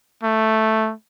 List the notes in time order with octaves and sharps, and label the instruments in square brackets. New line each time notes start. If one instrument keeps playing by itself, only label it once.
[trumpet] A3